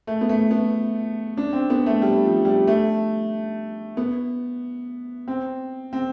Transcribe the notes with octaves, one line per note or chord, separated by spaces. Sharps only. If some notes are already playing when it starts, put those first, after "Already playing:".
A3
B3
A3
B3
D4
C4
B3
A3
G3
F3
G3
A3
B3
C4
C4